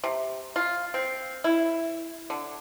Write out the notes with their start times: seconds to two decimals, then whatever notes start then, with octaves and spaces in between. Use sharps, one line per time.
0.04 C3
0.56 F4
0.94 C4
1.44 E4
2.30 D3